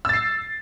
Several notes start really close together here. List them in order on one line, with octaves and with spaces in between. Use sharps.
E6 A6 C7